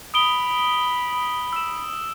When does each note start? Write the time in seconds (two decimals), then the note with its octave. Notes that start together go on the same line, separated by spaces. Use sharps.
0.14 B5 D#6 D7 G7
1.53 E6 E7